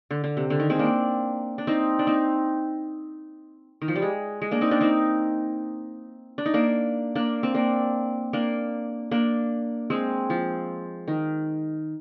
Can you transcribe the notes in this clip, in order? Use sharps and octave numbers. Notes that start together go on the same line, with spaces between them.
D3
D3
C3
D3
D#3
G#3 C4
A#3 D4
D4
C4 D#4
D4
C4 D#4
D#3
F3
G3
G#3
G#3
A#3 D4
C4 D#4
A#3 D4
C4 D#4
D4
D#4
A#3 D4
A#3 D4
C4
A#3 D4
A#3 D4
A#3 D4
G#3 C4
F3
D#3